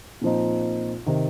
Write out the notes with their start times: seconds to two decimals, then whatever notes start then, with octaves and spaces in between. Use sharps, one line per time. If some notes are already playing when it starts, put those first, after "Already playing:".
0.21 A#2 F3 C4 D#4
1.06 C3 D#3